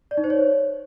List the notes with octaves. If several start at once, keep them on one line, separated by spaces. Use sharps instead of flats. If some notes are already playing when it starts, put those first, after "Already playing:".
D5
D#4
C5
C#5